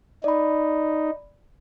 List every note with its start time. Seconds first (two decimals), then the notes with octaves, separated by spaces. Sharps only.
0.24 D#4 D5 B5